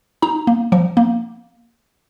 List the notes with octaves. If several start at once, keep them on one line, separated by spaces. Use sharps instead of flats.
D#4 A#5
A#3
F3
A#3